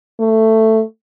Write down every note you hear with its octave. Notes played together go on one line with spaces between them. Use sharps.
A3